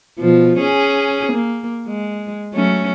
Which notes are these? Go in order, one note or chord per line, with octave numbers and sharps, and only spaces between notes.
B2 F3
C#4 G#4
A#3
G#3
F#3 A3 C#4